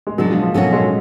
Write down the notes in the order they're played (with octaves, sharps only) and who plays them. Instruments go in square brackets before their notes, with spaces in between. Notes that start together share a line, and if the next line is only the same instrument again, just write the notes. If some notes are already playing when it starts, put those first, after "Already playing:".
[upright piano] G#3
[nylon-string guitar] B2 G#3 D4 [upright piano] F#3
[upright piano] F3
F3
[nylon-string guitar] B2 A3 C#4 F#4 [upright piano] F#3
[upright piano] G#3